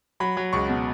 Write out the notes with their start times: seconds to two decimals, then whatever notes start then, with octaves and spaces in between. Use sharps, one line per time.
0.20 F#3 B5
0.37 F#3
0.53 C#2 C#6
0.69 B2